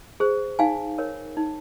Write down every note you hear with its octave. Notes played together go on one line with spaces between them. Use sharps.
G#4 C5
D#4 F5 G#5
A#4 C#5
D#4